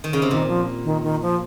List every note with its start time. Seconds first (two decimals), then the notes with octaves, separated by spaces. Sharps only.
0.04 D#3
0.13 C#3
0.22 C3
0.30 A#2 D#3
0.48 F3
0.85 D#3
1.03 D#3
1.22 F3